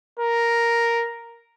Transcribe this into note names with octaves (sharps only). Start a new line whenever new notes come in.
A#4